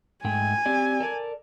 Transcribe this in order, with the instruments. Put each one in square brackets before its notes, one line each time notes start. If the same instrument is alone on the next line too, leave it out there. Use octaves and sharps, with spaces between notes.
[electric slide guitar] G#2 A3 G5 [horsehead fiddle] G#5
[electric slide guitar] C4 G4 D5
A4 A#4 D5